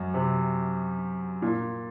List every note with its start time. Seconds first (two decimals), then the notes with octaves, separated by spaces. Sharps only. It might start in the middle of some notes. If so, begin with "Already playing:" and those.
Already playing: F#2
0.14 C3
1.42 A#2